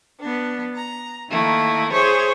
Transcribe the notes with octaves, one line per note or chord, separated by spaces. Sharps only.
B3 D4
A#5
D#3 A3 A#3 E4
E4 G#4 C5 C#5 C6